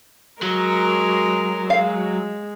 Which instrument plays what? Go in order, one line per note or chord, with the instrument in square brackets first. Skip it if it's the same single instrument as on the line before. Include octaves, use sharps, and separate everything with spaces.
[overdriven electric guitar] F#3 [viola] G#3 A#4
[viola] G#3 [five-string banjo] F5